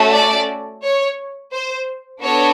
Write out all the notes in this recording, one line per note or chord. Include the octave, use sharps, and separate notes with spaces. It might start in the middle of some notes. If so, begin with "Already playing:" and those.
Already playing: A3 C#4 F#4 A4
D5
C#5
C5
B3 D4 F#4 A4 C#5